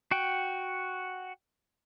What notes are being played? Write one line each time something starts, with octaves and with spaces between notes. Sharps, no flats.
F#4 F#5 G5